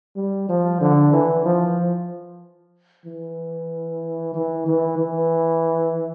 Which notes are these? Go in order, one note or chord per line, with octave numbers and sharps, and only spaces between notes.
G3
F3
D3
E3
F3
E3
E3
E3
E3